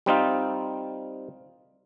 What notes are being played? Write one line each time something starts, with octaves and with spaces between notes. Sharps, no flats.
G3 C4 D#4 F4